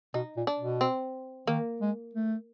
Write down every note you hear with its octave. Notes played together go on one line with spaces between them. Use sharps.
B2 D#4
A#2
D4
B2
C4
D#3 A#3
G#3
A3